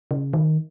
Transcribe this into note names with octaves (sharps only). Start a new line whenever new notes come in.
C#3
D#3